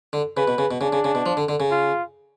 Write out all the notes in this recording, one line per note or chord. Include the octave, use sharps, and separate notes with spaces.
D3
C#3 B4
B2
C#3
B2
C#3 D4
C#3
C#3
B2
F3
D3
D3
C#3
F4